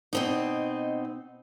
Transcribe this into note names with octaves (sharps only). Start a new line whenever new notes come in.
B2 C4 D#4